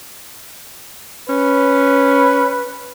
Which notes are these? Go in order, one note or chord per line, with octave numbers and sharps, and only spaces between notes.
C#4 B4